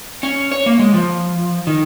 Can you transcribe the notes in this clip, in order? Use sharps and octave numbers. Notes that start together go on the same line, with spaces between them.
C#4
C#5
A#3
G#3
F3
D#3